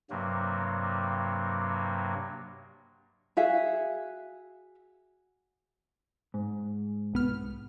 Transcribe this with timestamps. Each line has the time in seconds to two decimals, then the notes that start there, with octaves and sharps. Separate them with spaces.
0.10 G2 C3 F#3 A#3
3.37 F#4 G#4 E5 F5
6.34 G#2
7.13 C2 B3 F6